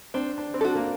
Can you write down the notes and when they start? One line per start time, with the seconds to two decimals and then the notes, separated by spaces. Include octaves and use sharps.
0.14 C4 D4
0.38 D4
0.54 C4
0.61 D4 F#4 A4
0.75 A#3